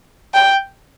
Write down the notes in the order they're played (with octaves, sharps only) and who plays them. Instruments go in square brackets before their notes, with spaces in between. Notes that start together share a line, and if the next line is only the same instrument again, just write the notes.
[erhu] G5